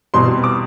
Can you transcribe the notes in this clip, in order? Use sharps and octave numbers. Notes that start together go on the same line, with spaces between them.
E2 B2 G3 C4 C6
D6